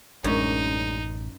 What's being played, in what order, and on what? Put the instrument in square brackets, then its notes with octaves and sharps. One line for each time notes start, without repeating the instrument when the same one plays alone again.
[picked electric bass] A1 [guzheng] F#2 [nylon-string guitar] G#3 A#3 D4 [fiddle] D#4